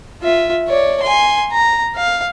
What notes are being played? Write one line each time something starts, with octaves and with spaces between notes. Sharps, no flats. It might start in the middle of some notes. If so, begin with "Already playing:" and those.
F4 E5
C#5 D5
G#5 C6
A#5
F5